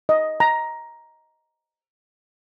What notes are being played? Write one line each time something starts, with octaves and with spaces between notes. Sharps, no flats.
D#5
A#5